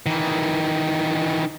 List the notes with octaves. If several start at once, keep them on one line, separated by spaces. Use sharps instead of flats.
D#3 E3